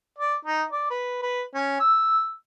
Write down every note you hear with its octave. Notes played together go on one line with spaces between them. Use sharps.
D5
D#4
D5
B4
B4
C#4
E6